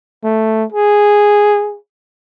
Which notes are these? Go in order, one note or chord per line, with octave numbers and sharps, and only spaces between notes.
A3
G#4